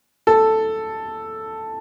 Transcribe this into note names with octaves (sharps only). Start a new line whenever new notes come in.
A4